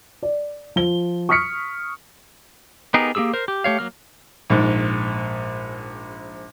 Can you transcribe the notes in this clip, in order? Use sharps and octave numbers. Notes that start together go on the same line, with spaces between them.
D5
F3 G7
C#6 D#6 F6 B6 C#7
B3 D#4 G4 G#4 A#4
A#3 D4 G4 G#4 E6
A#4 C5
G4
A3 G4 C#5 F5
F#3 A#3 F6
A#1 G#2